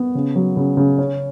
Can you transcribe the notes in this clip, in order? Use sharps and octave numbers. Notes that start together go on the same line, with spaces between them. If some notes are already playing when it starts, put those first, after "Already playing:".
Already playing: B3
C#3
F#3
C#3
C#3
C#4